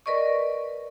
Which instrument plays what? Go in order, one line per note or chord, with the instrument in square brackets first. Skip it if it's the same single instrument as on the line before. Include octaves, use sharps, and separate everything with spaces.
[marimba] A#4 B4 D5 D#5 C#6